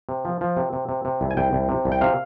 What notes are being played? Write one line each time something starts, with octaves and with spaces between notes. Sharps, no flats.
C3
F3
F3
C3
C3
C3
C3
C2
G#5
C2 G5
C2
C3
C2
G5
C3 F5